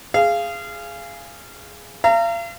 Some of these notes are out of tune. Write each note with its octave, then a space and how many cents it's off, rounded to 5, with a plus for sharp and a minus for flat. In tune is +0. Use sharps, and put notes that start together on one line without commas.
G#4 +0 F5 -20
F5 -40 A#5 -25